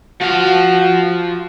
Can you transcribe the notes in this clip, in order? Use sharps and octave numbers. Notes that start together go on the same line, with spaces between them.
F3 F#4 F5